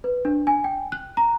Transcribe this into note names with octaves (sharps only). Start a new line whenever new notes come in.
B4
D4
G#5
G5
F#6
A#5